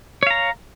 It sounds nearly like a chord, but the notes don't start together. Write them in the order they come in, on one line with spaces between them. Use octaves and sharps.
C#5 F5 A#5